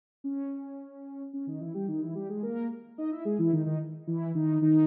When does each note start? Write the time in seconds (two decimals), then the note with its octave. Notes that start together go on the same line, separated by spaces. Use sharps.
0.24 C#4
1.34 C#4
1.47 D#3 D#4
1.61 E3 E4
1.74 G3 G4
1.88 D#3 D#4
2.02 E3 E4
2.15 G3 G4
2.29 G#3 G#4
2.43 A#3 A#4
2.98 D#4 D#5
3.11 E4 E5
3.25 G#3 G#4
3.39 E3 E4
3.52 D#3 D#4
3.66 D#3 D#4
4.07 E3 E4
4.35 D#3 D#4
4.62 D#3 D#4